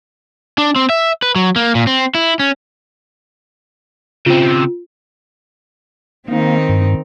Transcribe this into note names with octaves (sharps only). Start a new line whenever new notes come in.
D4
C4
E5
B4
F#3
A#3
A#2
C4
E4
C#4
C#3 C4 F4
D#3 A#3 C4 D#4 F5
G2